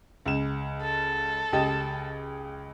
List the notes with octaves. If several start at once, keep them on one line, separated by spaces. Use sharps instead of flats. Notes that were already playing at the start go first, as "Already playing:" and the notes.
C#2 E7
A4
C#2 G4 D#5